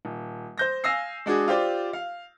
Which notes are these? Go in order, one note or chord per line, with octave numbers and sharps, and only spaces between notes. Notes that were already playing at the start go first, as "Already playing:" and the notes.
D#1
C5 G6 A#6
F5 G#5 E6 A#6 C7
G#3 D4 F#4 G#4
F4 G4 C5 D5
F5